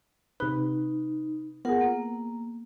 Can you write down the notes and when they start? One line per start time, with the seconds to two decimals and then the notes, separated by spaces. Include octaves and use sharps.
0.40 C3 D#4 B4
1.65 B3 F4 G#4 A#4 F#5
1.81 A#3